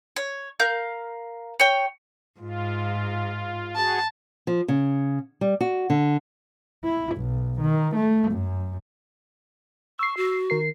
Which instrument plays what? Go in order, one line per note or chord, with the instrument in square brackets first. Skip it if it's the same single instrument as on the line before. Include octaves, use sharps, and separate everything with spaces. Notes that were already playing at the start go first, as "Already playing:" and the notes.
[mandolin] C#5
A#4 F5 G6
C#5 G5
[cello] G#2 [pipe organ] F4
[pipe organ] F#4 G#4 [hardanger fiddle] A5
[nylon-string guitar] F3
C#3
G3
F#4
D3
[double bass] E4
B1
D#3
A3
F#2
[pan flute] C#6 [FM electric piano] E6 C7
[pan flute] F#4
[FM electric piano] D#3 A#4 C7